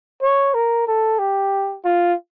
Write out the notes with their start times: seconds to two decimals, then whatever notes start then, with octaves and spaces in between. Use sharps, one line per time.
0.22 C#5
0.54 A#4
0.87 A4
1.19 G4
1.84 F4